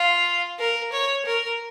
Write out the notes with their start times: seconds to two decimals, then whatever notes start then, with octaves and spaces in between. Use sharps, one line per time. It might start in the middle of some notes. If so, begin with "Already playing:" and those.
Already playing: F4
0.59 A#4
0.93 C#5
1.26 A#4